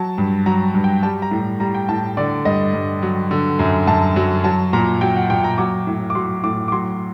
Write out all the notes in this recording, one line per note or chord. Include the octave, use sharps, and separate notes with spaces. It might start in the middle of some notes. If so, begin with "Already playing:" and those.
Already playing: F#3 A5
G2
F#3 A#5
G2
G5
G3 A5
A#5
A2
G3 A#5
G5
A2 A5
D3 D5
G2 D#5
G2
F#3
D3
F#2
F#2 A5
F#3
F#3 A5
A#2 A#5
F#3 G5
F#5
A#2 G5
A#5
F#3 D6
A2
D6
F#3 C6
A2 D6
D6
F#3 C6